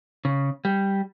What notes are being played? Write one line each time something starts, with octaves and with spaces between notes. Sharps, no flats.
C#3
G3